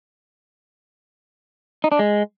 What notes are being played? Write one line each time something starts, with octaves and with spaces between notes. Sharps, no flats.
D#4
D4
G#3